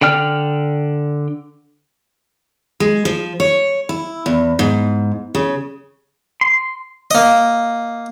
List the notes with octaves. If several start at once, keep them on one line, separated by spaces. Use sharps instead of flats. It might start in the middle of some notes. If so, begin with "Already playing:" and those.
D3 D5 G5 F6
G#3
F3
C#5
E4
E2
G#2
C#3
C6
A#3 D#5